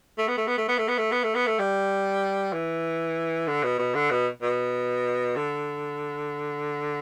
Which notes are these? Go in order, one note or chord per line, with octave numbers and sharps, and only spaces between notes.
A3
B3
A3
B3
A3
B3
A3
B3
A3
B3
A3
B3
A3
G3
E3
D3
B2
B2
D3
B2
B2
D3